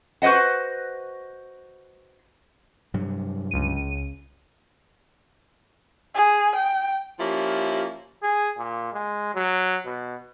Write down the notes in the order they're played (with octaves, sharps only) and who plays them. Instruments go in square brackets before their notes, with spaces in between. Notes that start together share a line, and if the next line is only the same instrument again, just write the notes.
[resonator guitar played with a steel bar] F#4 B4 C5 D#5 F#5
[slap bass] G2 C3 F#3
[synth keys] C#2 D#7
[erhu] G#4
G5
[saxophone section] F3 A#3 C#4 E4 F4 G4
[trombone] G#4
A#2
G#3
F#3
B2